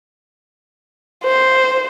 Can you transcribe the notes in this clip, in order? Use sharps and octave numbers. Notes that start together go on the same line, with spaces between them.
C5